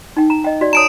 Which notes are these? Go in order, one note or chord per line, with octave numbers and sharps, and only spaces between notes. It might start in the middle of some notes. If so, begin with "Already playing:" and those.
D#4 G5
A#5
D#5 G5
F#4 D5
C#5 A5 A#5 D#6 D7 E7